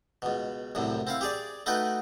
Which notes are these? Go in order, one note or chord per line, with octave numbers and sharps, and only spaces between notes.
C#2 B2
C2 F#2 A2 C3
C4 E4 F5
G4 G#4 D5
A3 D#4 F#4 B4 G5